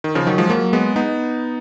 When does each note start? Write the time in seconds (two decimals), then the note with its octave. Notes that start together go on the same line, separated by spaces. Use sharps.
0.04 D#3
0.15 C#3 F3
0.27 D#3 F#3
0.38 F3 G#3
0.50 F#3 A#3
0.73 G#3 B3
0.96 B3 D#4